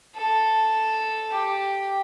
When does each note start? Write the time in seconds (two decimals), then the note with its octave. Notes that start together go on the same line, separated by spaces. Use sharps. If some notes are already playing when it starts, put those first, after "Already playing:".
0.16 A4
1.31 G4